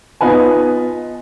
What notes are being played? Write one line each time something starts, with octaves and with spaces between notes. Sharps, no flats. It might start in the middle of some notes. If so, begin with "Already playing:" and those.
B3 D#4 F4 B4 G#5